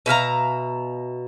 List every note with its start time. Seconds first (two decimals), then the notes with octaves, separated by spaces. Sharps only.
0.06 B2 E5 F5 A#5